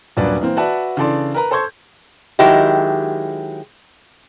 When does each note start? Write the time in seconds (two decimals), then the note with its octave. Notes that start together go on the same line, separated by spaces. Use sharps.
0.17 D#1 A#2 F#3 D4 B4 D5
0.41 E3 A#3 C4
0.57 F#4 B4 D5 E5 F#5 A5
0.97 C#3 E3 D4 A4 D5 C6
1.34 A#4 B4 A#5
1.51 A4 C5 C6 C#6 G6 G#6
2.39 D#3 F#3 G#3 E4 G4